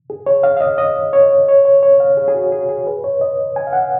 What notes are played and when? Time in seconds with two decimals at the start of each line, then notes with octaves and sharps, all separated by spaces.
0.10 G#4
0.26 C#5
0.43 F5
0.57 F5
0.61 D#5
0.78 D#5
1.13 C#5
1.49 C#5
1.65 C#5
1.83 C#5
2.00 F5
2.17 G#4
2.28 G#4
2.35 F#4
2.52 G#4
2.69 G#4
2.87 B4
3.04 C#5
3.21 D#5
3.56 G#5
3.67 F5
3.73 F#5